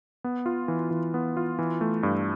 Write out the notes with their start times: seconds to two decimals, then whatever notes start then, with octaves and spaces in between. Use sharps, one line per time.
0.24 B3
0.46 F4
0.68 E3
0.91 E3
1.14 B3
1.37 F4
1.59 E3
1.81 A3
2.03 G2